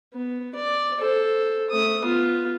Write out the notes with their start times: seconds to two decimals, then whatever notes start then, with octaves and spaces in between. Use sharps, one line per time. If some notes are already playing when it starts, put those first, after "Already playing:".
0.14 B3
0.55 D5
0.99 A4 C5
1.70 A3 D#6
2.03 B3 F4